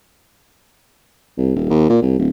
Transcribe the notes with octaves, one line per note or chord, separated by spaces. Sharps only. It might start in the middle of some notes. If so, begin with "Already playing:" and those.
C2
D#1
D#2
A#2
C2
D1